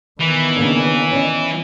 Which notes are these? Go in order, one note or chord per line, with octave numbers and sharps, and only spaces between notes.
D#3 E3 B3
C#3 A#3 D4
C#4 D5 D#5